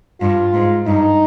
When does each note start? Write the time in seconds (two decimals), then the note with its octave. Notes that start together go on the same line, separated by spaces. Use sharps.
0.21 G2 F4
0.54 G#2
0.86 G2 D#4